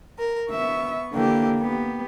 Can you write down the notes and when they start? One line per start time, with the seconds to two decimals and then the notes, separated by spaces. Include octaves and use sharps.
0.19 A#4
0.50 B3 E5 C#6
1.13 D3 E3 A#3 G4
1.59 B3 G4